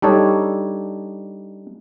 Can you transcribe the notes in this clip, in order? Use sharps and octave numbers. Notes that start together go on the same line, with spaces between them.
G3 D4 D#4 A4 C#5